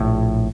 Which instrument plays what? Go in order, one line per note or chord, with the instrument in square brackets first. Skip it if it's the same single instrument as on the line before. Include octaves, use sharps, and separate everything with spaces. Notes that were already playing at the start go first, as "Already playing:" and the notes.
Already playing: [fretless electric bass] A#1 A2